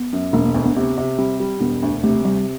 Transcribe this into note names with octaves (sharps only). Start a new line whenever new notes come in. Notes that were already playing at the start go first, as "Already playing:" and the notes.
Already playing: B3
F#2
E1 A#3
A#3
D2 B3
B3
C3 B3
C3
G3 C4
G3
E1 B3
D2
C3 A3
C3 G3